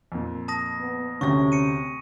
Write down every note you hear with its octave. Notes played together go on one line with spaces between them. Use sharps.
F2 A#2
A5 D#6 A#6
B3
D2 C3 C#4 C#6 A#6
C#7 D#7